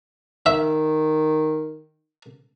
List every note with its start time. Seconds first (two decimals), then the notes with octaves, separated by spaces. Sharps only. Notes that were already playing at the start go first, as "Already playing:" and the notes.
0.46 D#3 E5